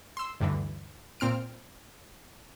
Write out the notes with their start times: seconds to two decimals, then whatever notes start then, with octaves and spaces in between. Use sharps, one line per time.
0.17 C6 E6
0.40 D2 G2 D3 E3
1.20 A#2 C4 F6 D7